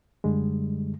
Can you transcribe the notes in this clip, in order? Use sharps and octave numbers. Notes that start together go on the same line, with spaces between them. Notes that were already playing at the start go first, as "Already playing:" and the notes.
F#2 D3 G3 G#3